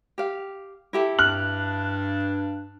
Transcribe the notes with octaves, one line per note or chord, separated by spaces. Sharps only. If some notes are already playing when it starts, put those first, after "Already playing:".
G4 F5
E4 G4 A4
G2 D4 F6 F#6 F#7